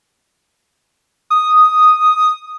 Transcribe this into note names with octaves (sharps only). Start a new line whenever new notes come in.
D#6